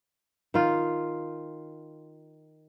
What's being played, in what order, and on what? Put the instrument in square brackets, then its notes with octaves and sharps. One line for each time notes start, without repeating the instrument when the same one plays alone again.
[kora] D#3 F4